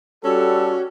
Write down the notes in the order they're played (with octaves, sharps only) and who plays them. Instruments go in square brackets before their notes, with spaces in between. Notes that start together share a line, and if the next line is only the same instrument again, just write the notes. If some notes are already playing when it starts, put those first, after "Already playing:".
[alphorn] G3 [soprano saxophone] C#4 [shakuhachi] F#4 [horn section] A4